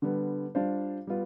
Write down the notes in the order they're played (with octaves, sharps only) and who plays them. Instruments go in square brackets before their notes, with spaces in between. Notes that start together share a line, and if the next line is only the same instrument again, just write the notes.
[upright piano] D3 G3 B3
G3 D4 F4 C5 F5
G3 B3 F4